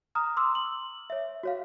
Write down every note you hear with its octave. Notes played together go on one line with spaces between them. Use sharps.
A#5 D#6 F6
C6 D6 E6
F#7
C#5 E5
F#4 C#5 F5